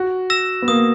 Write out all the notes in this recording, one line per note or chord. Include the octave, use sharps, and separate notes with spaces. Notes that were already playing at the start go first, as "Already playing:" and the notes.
Already playing: F#4
E6 A#6 E7
B3
A#3 D#6